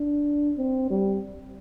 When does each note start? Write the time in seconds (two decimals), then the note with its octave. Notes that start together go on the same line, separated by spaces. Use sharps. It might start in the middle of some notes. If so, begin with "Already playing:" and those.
Already playing: D4
0.57 C4
0.90 G3